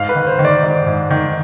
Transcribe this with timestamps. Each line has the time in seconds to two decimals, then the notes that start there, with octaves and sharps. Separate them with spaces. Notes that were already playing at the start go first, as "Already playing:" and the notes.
Already playing: G#2 F5
0.09 B4
0.15 D#3
0.27 C5
0.39 D#3
0.45 D5
0.63 G#2
0.86 G#2
1.11 D#3